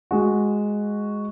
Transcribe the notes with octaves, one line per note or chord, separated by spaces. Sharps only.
G#3 F#4